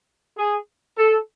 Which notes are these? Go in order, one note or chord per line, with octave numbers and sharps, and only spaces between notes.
G#4
A4